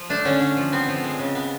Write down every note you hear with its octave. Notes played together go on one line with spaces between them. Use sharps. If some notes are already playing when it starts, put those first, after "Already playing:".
Already playing: F3
A3 D4
D3 C#4
D3
F3
B3 C4
F3
G#3
C#3
B3